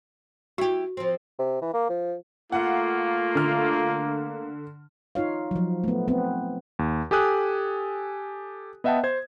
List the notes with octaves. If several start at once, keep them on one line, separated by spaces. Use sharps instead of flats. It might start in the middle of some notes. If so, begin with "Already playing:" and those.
E4 F#4 G4
F3 C4
C3
E3
A#3
F3
A3 A#3 F4 F#5
D3 F6
D#4 F4 C#5 F5
F3 F#3
A3 B3
B3 C4
D#2
G4 A4 G#5 D#6 F#6
B3 D#5 E5 F#5 G5 A5
C5 G#6